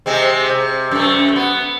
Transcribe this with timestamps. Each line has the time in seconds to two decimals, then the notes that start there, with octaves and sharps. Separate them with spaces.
0.06 C3 G#3 C4
0.49 C3
0.91 F#2 A3
1.36 B3